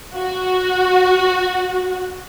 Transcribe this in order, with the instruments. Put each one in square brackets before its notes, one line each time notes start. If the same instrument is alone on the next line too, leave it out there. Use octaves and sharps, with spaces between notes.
[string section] F#4